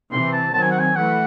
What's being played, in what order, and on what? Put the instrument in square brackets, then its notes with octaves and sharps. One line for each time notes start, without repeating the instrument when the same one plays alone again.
[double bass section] C3 E3 C4 [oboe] C6
[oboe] A5
[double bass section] D#3 F#3 C4 [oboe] A5
[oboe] G#5
F#5
G#5
[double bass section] E3 A3 [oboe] F#5